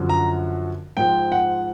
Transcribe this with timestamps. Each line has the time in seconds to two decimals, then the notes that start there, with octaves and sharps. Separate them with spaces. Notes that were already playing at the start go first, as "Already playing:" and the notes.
Already playing: F#2 D3 F3
0.09 A#5
0.97 G#2 F3 G5
1.32 F#5